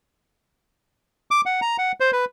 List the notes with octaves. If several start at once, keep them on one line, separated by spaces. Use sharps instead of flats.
D6
F#5
A#5
F#5
C5
B4